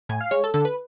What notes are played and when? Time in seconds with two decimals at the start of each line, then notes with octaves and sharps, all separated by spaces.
0.09 A2 G#5
0.21 F5
0.31 G#3 C#5
0.44 A4
0.54 D3 A4
0.65 B4